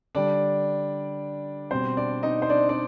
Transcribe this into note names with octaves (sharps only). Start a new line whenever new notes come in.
D3 G3 D4 D5
B2 G3 C4 C5
D4 D5
D#4 D#5
C5
D4 D5
D4 D5